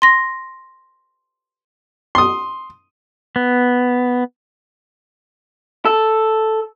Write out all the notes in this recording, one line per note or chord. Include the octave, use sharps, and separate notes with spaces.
C6 A#6
C6 D#6
B3
A4